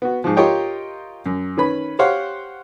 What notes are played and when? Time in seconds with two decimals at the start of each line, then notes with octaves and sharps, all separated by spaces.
0.02 B3 F#4
0.24 G#2 F3
0.37 F4 G4 A#4 C#5 D#5 G5
1.26 F#2
1.57 D#3 C#4 B4 B5
1.99 G4 C5 C#5 F5 F#5